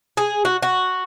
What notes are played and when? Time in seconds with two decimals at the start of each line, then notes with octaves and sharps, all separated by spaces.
0.17 G#4
0.45 F#4
0.62 F#4